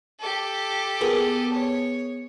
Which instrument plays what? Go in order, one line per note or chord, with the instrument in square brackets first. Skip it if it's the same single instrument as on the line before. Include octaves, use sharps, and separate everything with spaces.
[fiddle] G4 A4
[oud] B3 G#4 A#4
[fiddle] C#5